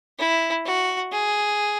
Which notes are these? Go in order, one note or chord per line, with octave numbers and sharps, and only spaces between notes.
E4
F#4
G#4